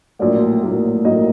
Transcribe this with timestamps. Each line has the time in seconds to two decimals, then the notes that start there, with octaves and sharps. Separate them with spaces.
0.19 A#1 A2 F#3 A#3 D5
0.63 A#1 A2 F#3 A#3
1.05 A#1 A2 F#3 A#3 D#5